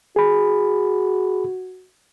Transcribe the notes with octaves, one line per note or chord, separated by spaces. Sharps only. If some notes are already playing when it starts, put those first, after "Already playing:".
F#4 G#4 B5